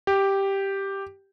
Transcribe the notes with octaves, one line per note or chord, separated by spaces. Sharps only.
G4